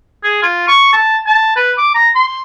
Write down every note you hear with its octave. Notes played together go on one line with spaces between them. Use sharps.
G#4
F4
C#6
A5
A5
B4
D6
A#5
C6